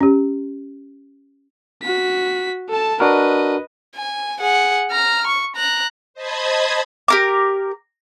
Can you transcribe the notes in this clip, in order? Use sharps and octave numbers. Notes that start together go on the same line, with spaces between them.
C#4 G4
F#4 B6
A4 A5
D4 F#4 A#4 B4 D#5
G#5
G#4 F#5
A#5 F6
C#6
A#5 F#6
C5 D#5 A5 B5 D#6 G#6
G4 A#4 D6